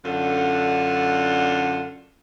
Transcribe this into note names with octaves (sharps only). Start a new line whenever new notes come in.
F#2 D3 D4 F4 A4 F#5